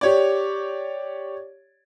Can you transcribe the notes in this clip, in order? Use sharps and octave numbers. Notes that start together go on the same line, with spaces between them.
G4 C#5 D5